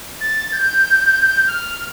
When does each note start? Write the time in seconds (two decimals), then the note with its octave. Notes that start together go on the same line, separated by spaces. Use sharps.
0.21 A6
0.53 G6
1.47 F6